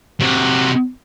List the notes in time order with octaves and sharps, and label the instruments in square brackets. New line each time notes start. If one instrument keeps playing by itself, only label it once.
[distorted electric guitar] C3 F#4